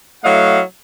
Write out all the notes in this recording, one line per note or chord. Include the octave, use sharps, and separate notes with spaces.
F#3 A3 E4 D#5 F5 F#5